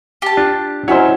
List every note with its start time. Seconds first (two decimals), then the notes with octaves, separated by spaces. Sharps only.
0.22 G4 A5
0.37 D4 F4
0.88 F#3 C#4 D#4 E4 C5 C#5